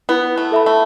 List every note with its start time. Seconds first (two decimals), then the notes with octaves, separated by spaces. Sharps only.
0.09 B3 E4
0.37 A3
0.52 A4 E5 B5
0.66 A3